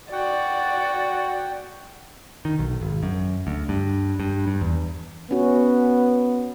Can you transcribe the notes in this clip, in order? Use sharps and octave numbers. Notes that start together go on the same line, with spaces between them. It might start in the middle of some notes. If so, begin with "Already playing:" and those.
F#4 D5 F#5 G5
D#3
B1
G#1
F#2
D2
G2
G2
G2
E2
B3 C#4 F#4